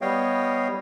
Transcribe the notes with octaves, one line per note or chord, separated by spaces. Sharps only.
G3 B3 C#5 D#5 F5 G5